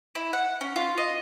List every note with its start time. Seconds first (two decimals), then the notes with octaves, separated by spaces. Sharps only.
0.15 E4
0.33 F#5
0.61 C#4
0.76 F4
0.98 D#5